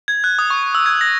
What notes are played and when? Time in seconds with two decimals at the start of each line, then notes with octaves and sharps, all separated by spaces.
0.08 G#6
0.24 F#6
0.39 D#6
0.50 C#6
0.75 E6
0.86 G#6
1.01 A#6